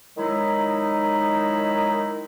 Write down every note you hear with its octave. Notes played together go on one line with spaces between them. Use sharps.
D#3 F#3 G#3 D#4 E4